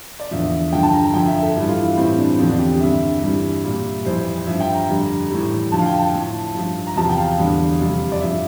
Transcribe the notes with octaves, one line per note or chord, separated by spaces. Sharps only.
D5
E2 D3 F3 E5
G2 D3 F3 G5
A5
A#5
A5
F2 D3 F3 G5
E5
A4
G2 E3 G3
F4
E4
A2 E3 G3 C4
D4
E2 D3 F3 C4
D4
G4
G4
G2 D3 G3 E5
G2 E3 G3
A#2 G3
F2 E3 G3 C5
G2 F3 E5
G5
A#5
F2 D3 G3
A2 E3 G3
F2 D3 F3 A5
F5
G5
A5
A2 F3
G2 F3
A#5
E2 C3 F3 A5
G5
F5
E2 D3 G3
F2 C3 G3
D5
G2 F3 E5